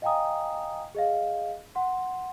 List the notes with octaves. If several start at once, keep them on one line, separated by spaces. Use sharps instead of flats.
D#5 F5 G5 G#5 A#5 D#6
G#4 D#5 F5
F#5 C6